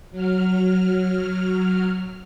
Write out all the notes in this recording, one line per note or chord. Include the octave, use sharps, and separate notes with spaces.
F#3 F6